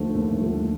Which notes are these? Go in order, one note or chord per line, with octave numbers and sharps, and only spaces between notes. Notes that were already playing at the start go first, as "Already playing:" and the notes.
Already playing: D#2 D3 F3 A3 C5
D#2
D3 F3 A3